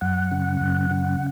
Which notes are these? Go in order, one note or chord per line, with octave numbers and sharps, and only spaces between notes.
F#2 F#5
C#3
F#2
C#3